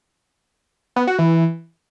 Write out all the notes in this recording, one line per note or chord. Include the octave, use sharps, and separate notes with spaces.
B3
F#4
E3